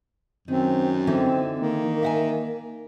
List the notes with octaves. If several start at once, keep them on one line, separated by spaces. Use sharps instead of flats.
F#2 D#3 C4
D3 E3 C4 D#4
D#3 A#3
E5 F#5 G#5